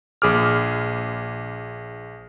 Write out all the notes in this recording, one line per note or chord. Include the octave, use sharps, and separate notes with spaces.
A#1 G#4 D6 F6